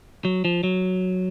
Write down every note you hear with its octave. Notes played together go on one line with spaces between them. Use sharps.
F#3
F3
F#3